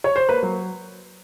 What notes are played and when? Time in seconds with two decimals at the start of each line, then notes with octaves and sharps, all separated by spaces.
0.04 C#5
0.16 C5
0.29 A#3 B4
0.43 F#3